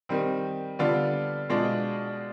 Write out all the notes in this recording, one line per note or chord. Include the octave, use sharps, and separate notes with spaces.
D#3 G3 C4
D3 G3 B3 D4 F4
B2 G#3 D4 F4